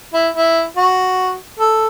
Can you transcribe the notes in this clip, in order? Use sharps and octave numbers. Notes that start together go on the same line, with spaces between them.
E4
E4
F#4
A4